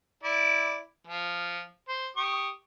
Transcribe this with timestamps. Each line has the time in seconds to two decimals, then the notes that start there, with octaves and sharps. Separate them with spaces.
0.24 E4 D5
1.07 F3
1.89 C5
2.17 G4 C#6 D#6